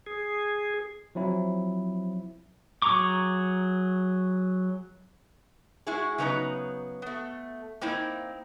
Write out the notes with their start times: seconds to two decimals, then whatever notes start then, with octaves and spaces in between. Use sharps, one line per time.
0.06 G#4
1.15 F3 F#3 C4 E4
2.82 F#3 G#4 A#5 C#6 D6
5.87 G#3 E4 F#4 G#4
6.18 C#3 F#3 B3 D#4 C#5 A#5
7.02 A3 B3
7.81 A#3 C4 D#4 E4